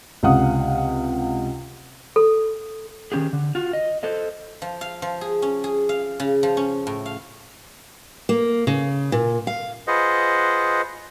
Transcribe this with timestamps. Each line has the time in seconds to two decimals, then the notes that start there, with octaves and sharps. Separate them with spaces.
0.23 C#2 C3 F5 F#5 D#6
2.16 A4
3.12 D#3 E3 C#4 G4 G#4
3.33 D3
3.55 F4 F#4
3.73 D#5
4.03 A4 C5 D#5
4.62 F3
4.81 F5
5.02 F3
5.21 G#4
5.42 C#4
5.64 G#4
5.89 F5
6.20 C#3
6.43 F3
6.57 C#4
6.87 A2
7.06 F5
8.29 A#3
8.67 C#3
9.12 A#2
9.47 F5
9.87 F4 G#4 B4 C5 D#5 F#5